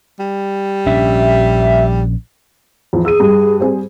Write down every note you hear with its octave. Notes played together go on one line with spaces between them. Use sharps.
G3
A#1 C#4 D4 E5
E2 F3
G#4 E6 D#7
G2
G3 C4 G#4